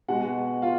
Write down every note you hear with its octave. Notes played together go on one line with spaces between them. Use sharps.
B2 G#3 F#4 F#5
F4 F5